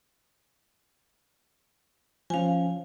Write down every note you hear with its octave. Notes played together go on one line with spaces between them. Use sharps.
F3 C#4 F5 G#5